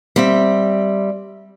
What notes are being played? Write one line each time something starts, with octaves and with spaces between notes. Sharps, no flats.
G3 C4 E5